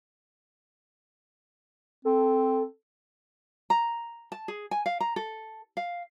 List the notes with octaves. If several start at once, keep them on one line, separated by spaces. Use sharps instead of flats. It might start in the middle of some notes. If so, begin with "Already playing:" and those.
C4 A4
A#5
A5
G#4
G#5
F5
A#5
A4
F5